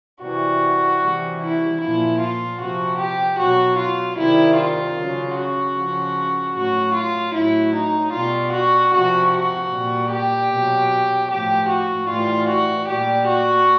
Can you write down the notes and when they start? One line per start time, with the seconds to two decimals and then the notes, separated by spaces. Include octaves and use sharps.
0.23 C3 E3 G3 F#4
1.02 C3 E3 G3
1.42 E4
1.81 A#2 F3 E4
2.20 F4
2.60 C3 F3 F#4
3.00 G4
3.39 B2 F#3 F#4
3.79 F4
4.18 C3 D#3 G3 E4
4.57 F4
4.97 C#3 F#3
5.36 F#4
5.77 C#3 F3
6.56 A2 F#3 F#4
6.95 F4
7.34 A2 F#3 E4
7.75 D#4
8.14 B2 G3 F4
8.53 F#4
8.93 C3 F3 F#4
9.32 F#4
9.72 A#2 G3
10.11 G4
10.51 B2 F#3
11.30 A2 F3 G4
11.70 F#4
12.09 A2 E3 G3 F4
12.49 F#4
12.89 A#2 G3 G4
13.28 F#4